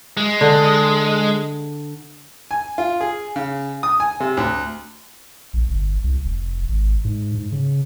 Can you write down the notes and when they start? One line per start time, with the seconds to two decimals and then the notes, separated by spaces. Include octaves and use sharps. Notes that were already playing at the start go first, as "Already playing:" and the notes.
0.17 G#3
0.41 D3
2.51 G#5
2.78 F4
3.01 G#4
3.36 C#3
3.83 D#6
4.00 G#5
4.20 C3
4.37 D2
5.54 A#1
5.70 G1
6.04 C2
6.25 F1
6.69 G#1
7.05 G#2
7.35 G#2
7.52 C#3